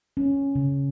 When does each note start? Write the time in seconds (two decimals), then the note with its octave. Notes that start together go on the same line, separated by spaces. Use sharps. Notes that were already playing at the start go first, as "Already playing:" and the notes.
0.17 C#4
0.55 C#3